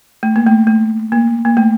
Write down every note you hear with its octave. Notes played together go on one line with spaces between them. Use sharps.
A3
A#3
A3
A3
A#3
A#3
A3